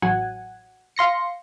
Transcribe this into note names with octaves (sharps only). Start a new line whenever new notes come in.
A1 F#3 F#5 G#5
F5 C6 A#6 C#7